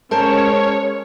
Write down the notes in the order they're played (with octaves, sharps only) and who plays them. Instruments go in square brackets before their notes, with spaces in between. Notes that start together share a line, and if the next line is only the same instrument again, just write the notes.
[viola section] G#3 C#4 [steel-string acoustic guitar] A#4 C5 A5 [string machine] C#5